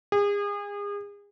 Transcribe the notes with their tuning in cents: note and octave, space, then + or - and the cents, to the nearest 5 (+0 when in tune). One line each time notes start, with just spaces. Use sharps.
G#4 -35